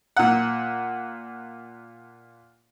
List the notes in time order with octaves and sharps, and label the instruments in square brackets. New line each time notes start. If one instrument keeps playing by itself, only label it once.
[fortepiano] A#2 F#5